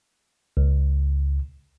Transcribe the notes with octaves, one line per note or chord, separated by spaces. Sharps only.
C#2